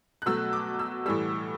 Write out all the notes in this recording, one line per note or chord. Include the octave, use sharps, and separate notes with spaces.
F#6
B2 F#3 A3 E6
D6
E6
A2 E3 G3 E6